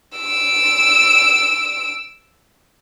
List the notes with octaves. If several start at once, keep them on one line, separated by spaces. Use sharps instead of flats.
E6 D7